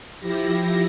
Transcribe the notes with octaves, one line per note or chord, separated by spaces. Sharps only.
F3 E4 G4 A#6